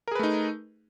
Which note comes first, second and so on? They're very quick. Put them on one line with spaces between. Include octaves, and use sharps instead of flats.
A#4 G#4 B4 A3 D#4